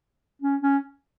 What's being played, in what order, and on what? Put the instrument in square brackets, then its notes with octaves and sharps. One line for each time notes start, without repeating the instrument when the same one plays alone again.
[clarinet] C#4
C#4